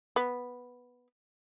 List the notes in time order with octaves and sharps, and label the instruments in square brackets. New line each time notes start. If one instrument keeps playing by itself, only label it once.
[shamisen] B3